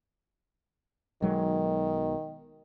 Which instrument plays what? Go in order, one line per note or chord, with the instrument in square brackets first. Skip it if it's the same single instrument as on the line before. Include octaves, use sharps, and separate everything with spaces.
[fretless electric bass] B1 F#3 G#3 [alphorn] D#3